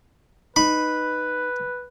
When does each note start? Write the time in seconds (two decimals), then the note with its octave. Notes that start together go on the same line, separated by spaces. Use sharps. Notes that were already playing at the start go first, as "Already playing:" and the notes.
0.56 D#4 B4 B5